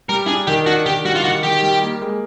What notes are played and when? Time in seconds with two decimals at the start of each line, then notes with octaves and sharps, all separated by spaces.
0.09 G3 A#4
0.27 D4 G#4
0.47 D#3 G4
0.66 D4 F#4
0.86 D#3 G4
1.04 G3 F#4
1.15 F4
1.23 D#3 F#4
1.43 D#3 G4
1.62 G3
1.82 A#3
2.01 G#3